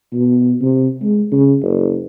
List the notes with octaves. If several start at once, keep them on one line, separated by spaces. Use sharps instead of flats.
B2
C3
G#3
C#3
F#1